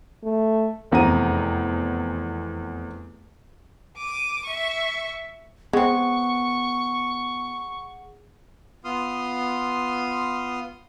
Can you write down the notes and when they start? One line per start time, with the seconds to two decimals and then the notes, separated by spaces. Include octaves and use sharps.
0.23 A3
0.92 F1 E2 C4 A#5 D#7
3.97 D6 D#7
4.46 E5 C#6
5.73 G#3 B3 C4 G#4 F#5 C#6
8.84 B3 F4 C6 D#6 F6